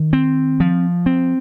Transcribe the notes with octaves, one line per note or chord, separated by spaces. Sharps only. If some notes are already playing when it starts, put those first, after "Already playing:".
Already playing: D#3
C4
F3
C4